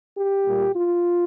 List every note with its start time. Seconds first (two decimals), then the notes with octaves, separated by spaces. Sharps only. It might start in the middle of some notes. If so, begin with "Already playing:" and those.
0.18 G4
0.46 A#2 G3 A#3
0.74 F4